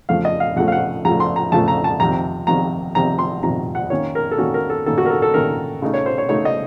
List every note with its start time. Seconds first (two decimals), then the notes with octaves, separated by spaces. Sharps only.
0.09 F2 C#3 F3 A3 F5
0.25 D#5
0.40 F5
0.56 F2 C#3 F3 A3 F#5
0.68 F5
0.72 F#5
1.05 F2 C#3 F3 A3 A#5
1.20 C6
1.36 A#5
1.52 F2 C#3 F3 A3 A5
1.68 A#5
1.84 A5
2.00 F2 C3 D#3 A#5
2.47 F2 C3 D#3 A#5
2.95 F2 C3 D#3 A#5
3.19 C6
3.43 F2 C3 D#3 A#5
3.75 F#5
3.90 D#3 A#3 C#4 C#5
4.15 A#4
4.31 A4
4.38 D#3 A#3 C#4 F#4
4.54 A#4
4.70 A4
4.86 D#3 A#3 C#4 A4
4.98 F#4
5.06 A#4
5.10 A4
5.22 A4
5.34 D#3 A#3 C#4 A#4
5.82 C#3 A3 D#4
5.94 C#5
6.06 C5
6.18 C#5
6.29 C#3 A3 D#4 C#5
6.45 D#5